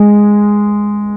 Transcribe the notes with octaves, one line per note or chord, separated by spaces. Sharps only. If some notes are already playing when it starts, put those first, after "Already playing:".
Already playing: G#3